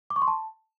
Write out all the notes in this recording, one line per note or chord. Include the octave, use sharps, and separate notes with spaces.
D6
C#6
C6
A5